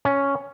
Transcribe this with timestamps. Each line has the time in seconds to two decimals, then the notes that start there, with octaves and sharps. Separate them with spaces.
0.05 C#4